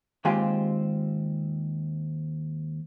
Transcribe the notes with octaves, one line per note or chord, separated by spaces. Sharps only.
D#2 G#3 C4 F4 G4 G#5